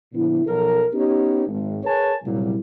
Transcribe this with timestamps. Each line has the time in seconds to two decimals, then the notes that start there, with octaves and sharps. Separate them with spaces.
0.12 A#2 D3 F3 B3 E4
0.46 B1 F3 A4 A#4
0.93 B3 C#4 D#4 G4
1.47 G#1
1.83 G#4 A#4 B4 C#5 G#5 A5
2.24 F#1 C2 A#2 F#3 G3 E4